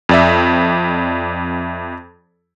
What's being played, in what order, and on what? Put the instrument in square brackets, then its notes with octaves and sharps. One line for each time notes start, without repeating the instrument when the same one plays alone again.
[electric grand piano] F2 D5 E5